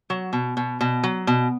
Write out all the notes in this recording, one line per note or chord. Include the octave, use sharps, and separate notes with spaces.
F#3
B2
B2
B2
F#3
B2